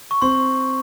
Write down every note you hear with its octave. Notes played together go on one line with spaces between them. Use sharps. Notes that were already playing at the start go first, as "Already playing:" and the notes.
C#6
C4 C6